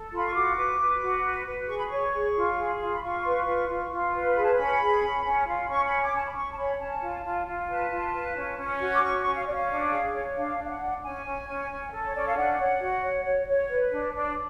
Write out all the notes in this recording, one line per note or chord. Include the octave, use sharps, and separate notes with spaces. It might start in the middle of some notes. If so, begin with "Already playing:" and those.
Already playing: A4
F4 B5
C#6
F#4 D6
B4
B4
F#4
B4
B4
G#4 C#6
B5
C#5 C#6
G#4
F4
G#4
F4
B5
F4 C#6
B4
F4
F4
F4
B4
G#4 B5
A5
C#4 B5
G#4
C#4
C#4
F4
C#4 C#6
B5
C#5
D6
C#4 A5
B5
C#4 C#6
A5
C#5 B5
C#4 A5
F4
F4
F4
B4 A5
F4
B4
C#4
C#4
F#4
D6
C#4 C#6
C#6
C#4
F5
C#4 D5
F5
D4
G#4
C#5
D4 F5
D4
F5
F#5
D4
C#4 G#5
C#4
C#4
C#4
A4
C#5
C#4 D5
F5
D4 F#5
C#5
F#4
C#5
C#5
C#5
B4
D4
D4